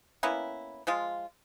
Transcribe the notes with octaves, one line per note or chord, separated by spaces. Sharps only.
A#3 B3 C#4 E4
F3 G#3 F4